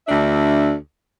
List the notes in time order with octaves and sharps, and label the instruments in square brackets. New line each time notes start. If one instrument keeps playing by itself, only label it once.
[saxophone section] D2 D4 E5